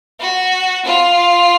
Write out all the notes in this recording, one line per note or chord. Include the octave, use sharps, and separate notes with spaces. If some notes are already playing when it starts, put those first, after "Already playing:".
F#4
F4